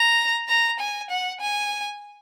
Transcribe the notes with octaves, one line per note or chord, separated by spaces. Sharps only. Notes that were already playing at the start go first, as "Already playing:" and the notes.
Already playing: A#5
A#5
G#5
F#5
G#5